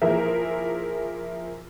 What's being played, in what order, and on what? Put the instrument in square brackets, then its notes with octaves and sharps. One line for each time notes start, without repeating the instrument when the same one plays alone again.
[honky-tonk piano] F3 A#3 E4 G#4 A#4 E5